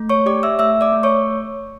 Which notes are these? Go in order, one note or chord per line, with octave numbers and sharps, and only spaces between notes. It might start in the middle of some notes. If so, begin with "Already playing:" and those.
Already playing: A3
C#5 C#6
G4 D5 D6
E5 E6
A3 E5 E6
D5 D6
A3
C#5 C#6